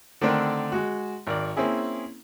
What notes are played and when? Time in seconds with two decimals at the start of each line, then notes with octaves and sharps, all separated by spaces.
0.21 D3 D#3 A3 C4 D4 A#4
0.72 G#3 F#4
1.27 G#1 A#4 D5
1.57 A#3 C4 C#4 E4 G#4